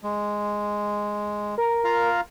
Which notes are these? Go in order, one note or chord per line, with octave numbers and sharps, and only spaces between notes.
G#3
A#4
F4 F5 A#5